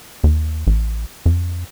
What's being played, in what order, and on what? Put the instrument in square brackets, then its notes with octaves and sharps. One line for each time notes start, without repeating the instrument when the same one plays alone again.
[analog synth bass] D#2
A1
F2